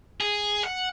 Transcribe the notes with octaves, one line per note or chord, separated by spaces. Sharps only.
G#4
F#5